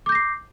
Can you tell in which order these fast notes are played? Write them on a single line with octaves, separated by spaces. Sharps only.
D6 G6 A#6 C7